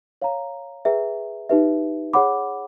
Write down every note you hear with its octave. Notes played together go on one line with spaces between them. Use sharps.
C#5 F5 A#5
G#4 B4 E5 G5 A#5
D#4 G4 B4 E5
G#4 C#5 F#5 B5 D6